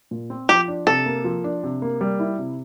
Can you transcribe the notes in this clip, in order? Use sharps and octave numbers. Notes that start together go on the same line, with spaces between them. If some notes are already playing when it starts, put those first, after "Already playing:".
A#2
C4
F3 G4
D4
C3 A4
A#3
F3
D4
C3
A#3
G3
E4
C3